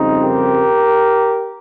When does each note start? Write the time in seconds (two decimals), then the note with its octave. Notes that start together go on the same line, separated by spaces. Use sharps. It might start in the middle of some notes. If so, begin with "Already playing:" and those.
Already playing: F2 C#3 G3 C4 D#4
0.23 G4 A#4